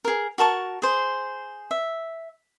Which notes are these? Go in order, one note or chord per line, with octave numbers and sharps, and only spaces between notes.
G#4 A#4
F#4 A#4 A5 C#6
G#4 C5
E5